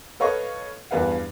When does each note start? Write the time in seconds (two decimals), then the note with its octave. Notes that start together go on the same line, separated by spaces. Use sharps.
0.20 A4 B4 C#5 D#5 F5 C#6
0.91 E2 G2 B4 F5 F#5